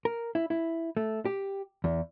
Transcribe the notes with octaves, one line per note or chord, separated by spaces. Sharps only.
A#4
E4
E4
A3
G4
E2